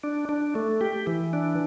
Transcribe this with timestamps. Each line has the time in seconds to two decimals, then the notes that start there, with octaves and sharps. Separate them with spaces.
0.04 D4
0.29 D4
0.55 A3
0.81 G4
1.07 E3
1.33 D4